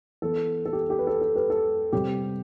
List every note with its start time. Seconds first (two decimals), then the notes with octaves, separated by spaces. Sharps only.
0.22 E3 B3 A4
0.66 A4
0.73 G4
0.90 G4
0.99 B4
1.07 A4
1.21 A4
1.35 G4 B4
1.50 A4
1.92 C3 G3 C4 G4